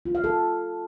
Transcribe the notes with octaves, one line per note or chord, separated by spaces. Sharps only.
F4
F5
A4